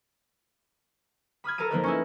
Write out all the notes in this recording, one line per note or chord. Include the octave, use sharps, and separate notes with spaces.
B5 D#6 F6 G#6
A4 A#4 A5 A#5 D#7
F3 A#3 D#4 A#4 B4 D#5
C#4 D#4 E4